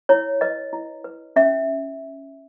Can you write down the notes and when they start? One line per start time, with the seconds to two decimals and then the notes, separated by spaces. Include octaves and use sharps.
0.09 E4 C#5
0.41 B4 D#5
0.73 E4
1.04 B4
1.36 C#4 E5